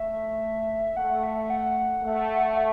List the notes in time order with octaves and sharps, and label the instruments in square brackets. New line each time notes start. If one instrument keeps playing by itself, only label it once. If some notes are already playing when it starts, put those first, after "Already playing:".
Already playing: [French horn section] A3 [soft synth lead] E5
[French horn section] A3 [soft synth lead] F#5
[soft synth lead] E5
F#5
[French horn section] A3
[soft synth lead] E5